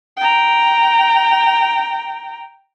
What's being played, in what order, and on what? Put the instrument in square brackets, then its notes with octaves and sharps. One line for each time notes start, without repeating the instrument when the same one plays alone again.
[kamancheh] G5 A#5